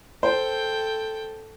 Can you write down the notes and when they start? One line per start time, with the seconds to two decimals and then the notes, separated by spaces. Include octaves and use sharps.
0.23 A4 C5 G5